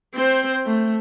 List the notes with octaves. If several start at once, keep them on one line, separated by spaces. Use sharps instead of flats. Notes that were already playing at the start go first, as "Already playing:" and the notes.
C4 C5
A3